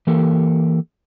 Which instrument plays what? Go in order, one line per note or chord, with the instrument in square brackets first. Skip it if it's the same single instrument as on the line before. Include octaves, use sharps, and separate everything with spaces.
[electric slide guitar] E3 A#3 G4 A4 A#4